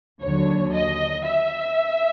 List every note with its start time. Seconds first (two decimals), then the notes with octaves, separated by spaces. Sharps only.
0.22 D#2 D3 F#3 C#5
0.73 D#5
1.25 E5